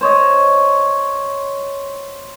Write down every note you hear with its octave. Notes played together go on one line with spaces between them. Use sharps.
C5 C#5 D#5